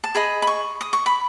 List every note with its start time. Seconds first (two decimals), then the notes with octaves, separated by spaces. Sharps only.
0.04 A5
0.15 G#4 D#5 B5
0.42 B5
0.47 C#6
0.81 D#6
0.93 C#6
1.06 B5